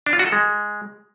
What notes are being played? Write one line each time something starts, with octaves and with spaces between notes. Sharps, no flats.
D4
F4
F#4
A4
G#3